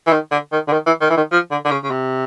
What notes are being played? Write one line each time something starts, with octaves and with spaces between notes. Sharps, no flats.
E3
D#3
D3
D#3
D3
D#3
E3
D#3
E3
D#3
F3
D3
D3
C#3
C#3
C3